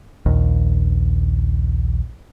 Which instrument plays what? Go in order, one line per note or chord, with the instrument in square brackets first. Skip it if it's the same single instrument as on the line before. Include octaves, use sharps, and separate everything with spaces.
[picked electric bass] A#1 D#2